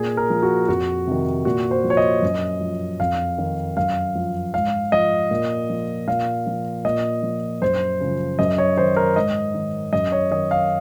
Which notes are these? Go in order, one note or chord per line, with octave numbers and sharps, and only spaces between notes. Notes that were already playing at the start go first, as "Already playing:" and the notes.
Already playing: A#2 G#4
A#4
F3
F#4
F2 F#4
C3 D#3
A#2 F#4
C5
F3
C#5
D#5
F#2
F3
F2 F5
D#3
F#2 F5
F3
G#2 F5
F3 D#5
A#2
F3
A#2 F5
F3
A#2 D#5
F3
F#2 C5
C#3 F3
F#2 D#5
C#5
D#3 C5
A#4
G#2 D#5
D#3
F#2 D#5
C#5
D#3 D#5
F5